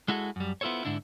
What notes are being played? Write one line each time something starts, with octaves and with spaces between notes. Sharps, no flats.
G#3 E4 F#4 G#4 A4
F#2 G3
B3 E4 F4 A4 C5 C#5
G#2 D3 D4 E4